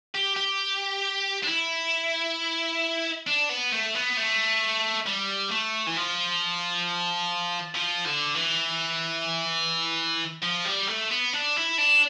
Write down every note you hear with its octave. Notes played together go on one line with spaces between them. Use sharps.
G4
G4
D4
E4
D4
B3
A3
B3
A3
G3
A3
E3
F3
F3
D3
E3
F3
G3
A3
B3
D4
E4
D4